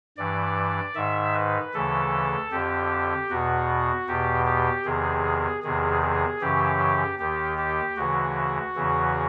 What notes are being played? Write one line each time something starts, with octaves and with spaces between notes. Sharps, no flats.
G2 E3 D5
G#2 D#3 E5
B4
D2 C#3 E3 A4
F2 D3 G4
E2 B2 F#4
E2 B2 G4
G4
E2 C3 D#3 G#4
E2 C3 D#3 G#4
G#4
F#2 C#3 E3 G4
D#2 D#3 G4
G4
D2 C#3 E3 F#4
E2 C#3 E3